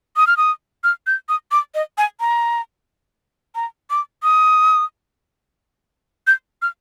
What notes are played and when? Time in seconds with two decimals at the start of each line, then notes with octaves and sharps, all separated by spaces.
0.16 D#6
0.27 F6
0.37 D#6
0.84 F6
1.07 G6
1.29 D#6
1.52 D6
1.75 D#5
1.98 G#5
2.20 A#5
3.55 A#5
3.90 D6
4.23 D#6
6.27 G6
6.62 F6